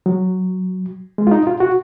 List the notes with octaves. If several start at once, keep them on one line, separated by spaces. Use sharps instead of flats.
F#3
G#3
F4
D#4
F4
F#4